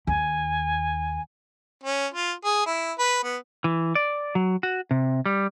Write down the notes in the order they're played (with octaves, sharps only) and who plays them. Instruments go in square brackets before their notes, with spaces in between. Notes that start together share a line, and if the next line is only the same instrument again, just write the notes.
[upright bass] D#2 [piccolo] G#5
[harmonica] C#4
F4
G#4
E4
B4
B3
[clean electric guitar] E3
D5
F#3
F#4
C3
G3